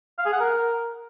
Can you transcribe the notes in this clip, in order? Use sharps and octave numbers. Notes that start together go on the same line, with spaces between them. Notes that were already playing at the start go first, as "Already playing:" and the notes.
F5
G#4
F#5
A#4